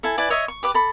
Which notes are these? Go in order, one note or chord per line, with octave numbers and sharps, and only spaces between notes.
E4 A4 G#5
E4 B4 D5 G#5
C#5 D#5 E5 C#6
C#6
G4 B4 D6
A4 B5